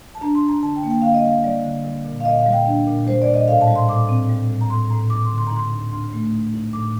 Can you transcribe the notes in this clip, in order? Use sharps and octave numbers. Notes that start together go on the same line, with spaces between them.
A5
D4 A#5
C6
D4
A#5
D3 A5
G5
A#3
G5
D3 F5
D#5
G3 F5
G3 D5
D3
G3
A#2
F5
A#2 D#5
F5
G3
G5
D4
A#2
G3 C5
D5
A#2
D#5
A2 F5
A5
G3
C6
A2 D6
C4
G3
A2
A#5
A2 C6
A2 A#5
D#4 D6
C6
D3
C6
D#4 A#5
C6
D2
D2 C6
A3
D#4
D#4
A2 D6